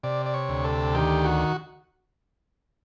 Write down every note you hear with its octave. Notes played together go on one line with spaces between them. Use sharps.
C3 D5
D5
C#5
D2
A4
D#3 G4
F#4